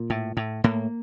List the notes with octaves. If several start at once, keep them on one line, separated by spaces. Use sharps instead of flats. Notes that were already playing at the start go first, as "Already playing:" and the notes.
Already playing: A#2
A2
A2
A2 A#3